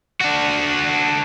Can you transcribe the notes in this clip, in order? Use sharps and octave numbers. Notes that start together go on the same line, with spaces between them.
D4 F#4